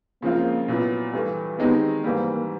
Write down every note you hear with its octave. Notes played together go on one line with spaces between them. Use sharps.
C#3 F3 G#3 A#3 C4 F4
A#2 F#3 B3 E4
G2 E3 A3
D#3 G#3 B3 C4 D#4 G4
G#2 E3 G3 A#3